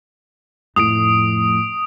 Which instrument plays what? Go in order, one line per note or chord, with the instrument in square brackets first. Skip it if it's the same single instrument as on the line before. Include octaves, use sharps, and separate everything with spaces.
[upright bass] F2 A2 [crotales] D#6 D7